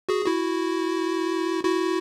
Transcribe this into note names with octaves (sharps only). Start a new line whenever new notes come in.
F#4 G#4
E4 F#4
E4 F#4